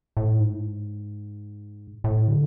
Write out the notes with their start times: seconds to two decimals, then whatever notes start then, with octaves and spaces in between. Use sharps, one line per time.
0.17 A2
0.40 G#2
2.04 A2
2.28 D3